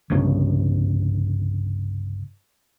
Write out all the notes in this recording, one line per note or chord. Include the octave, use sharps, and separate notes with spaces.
G1 C2 G2 C#3